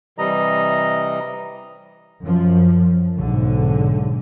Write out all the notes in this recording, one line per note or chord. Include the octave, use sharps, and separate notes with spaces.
C3 E3 G3 D#5 A#5
F#2 F3
B1 G#2 D3